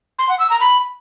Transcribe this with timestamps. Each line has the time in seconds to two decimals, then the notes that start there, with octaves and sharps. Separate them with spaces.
0.19 C6
0.29 F#5
0.40 E6
0.50 A#5
0.60 B5